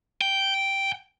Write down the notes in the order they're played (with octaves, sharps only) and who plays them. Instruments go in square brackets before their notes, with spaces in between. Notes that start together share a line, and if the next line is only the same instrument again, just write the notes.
[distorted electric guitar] G5